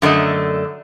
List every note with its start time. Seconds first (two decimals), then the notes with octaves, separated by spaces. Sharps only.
0.02 F#2 D3 A3 D#5